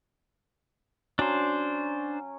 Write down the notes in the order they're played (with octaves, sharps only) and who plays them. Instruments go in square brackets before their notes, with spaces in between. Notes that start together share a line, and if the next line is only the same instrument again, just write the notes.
[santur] F#3 C#4 [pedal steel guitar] D4 C5